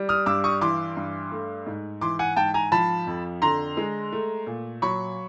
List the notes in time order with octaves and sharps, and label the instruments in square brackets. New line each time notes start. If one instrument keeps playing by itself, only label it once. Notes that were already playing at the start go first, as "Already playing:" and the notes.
Already playing: [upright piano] G3
D#6 F6
G2 D6 E6
C#6 D#6
E3 C6 D6
G2
A3
G#2
E3 C6 D6
F#5 G#5
G#2 G5 A5
G#5 A#5
F3 A5 B5
F2
D3 A#5 C6
G#3
A3
A#2
F#3 B5 C#6